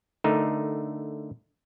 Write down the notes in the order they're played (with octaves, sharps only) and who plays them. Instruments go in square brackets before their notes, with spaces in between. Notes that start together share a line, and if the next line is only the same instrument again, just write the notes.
[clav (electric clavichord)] D3 A3 D#4 A#4